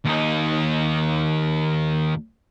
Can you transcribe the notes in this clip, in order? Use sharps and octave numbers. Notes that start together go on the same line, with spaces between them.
D#2 D#4